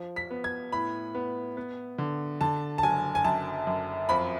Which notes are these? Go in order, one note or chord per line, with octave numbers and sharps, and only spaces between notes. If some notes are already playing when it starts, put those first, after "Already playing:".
Already playing: F3
B6
B3
G#6
A2 B5
B3
B3
D3
D3 A5
A5
F#1 G#5
G#5
F#2 A5
F#2
F2 B5